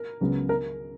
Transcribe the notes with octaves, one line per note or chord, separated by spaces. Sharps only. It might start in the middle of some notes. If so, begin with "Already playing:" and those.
Already playing: A#4
C#2 C#3 F#3 B3
A#4